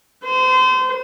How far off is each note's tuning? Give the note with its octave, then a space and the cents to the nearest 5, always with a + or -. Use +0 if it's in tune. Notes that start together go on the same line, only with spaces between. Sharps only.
C5 -30